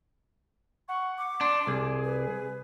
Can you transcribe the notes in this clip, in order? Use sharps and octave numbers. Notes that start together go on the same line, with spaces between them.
F#5 C#6
D6
D4 C6
C2 G#4
B4